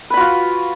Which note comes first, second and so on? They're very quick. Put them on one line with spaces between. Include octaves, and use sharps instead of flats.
B4 B5 F#4 F4